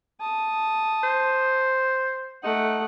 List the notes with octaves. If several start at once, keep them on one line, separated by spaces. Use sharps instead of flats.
A5 D#6
C5
A3 D#4 F#5